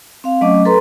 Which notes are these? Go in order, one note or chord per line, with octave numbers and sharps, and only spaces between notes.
C4 F5
F#3 A3 C#4 D#5 D6
A4 B4 A#5 C6